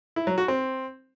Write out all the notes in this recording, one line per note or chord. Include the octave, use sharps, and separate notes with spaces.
E4
F#3
F#4
C4